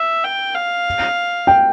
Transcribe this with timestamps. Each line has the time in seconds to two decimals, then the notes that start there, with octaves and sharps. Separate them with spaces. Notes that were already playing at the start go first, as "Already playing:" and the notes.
Already playing: E5
0.24 G5
0.55 F5
1.47 G5